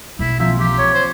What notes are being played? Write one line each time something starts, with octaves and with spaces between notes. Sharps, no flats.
B1 G#3 E4
F3 A#3 C4 E5
F3 G4
C#5
C5